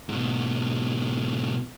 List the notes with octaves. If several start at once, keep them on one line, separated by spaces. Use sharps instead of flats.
G#2 B2